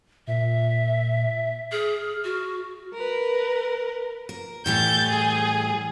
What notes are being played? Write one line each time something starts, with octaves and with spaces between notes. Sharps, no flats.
A#2 E5
G#4 F6
F#4
A#4 B4
A#4
A2 E3 G3 G6 A6
G#4